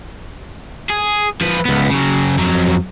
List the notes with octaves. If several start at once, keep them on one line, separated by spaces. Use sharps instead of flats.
G#4
F3 B4
C#2 B3
C#3 F#3
F2 F#3